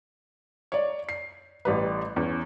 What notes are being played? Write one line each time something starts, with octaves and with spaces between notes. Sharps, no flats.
C#5 D5
C7
A1 G3 B4
E2 C#4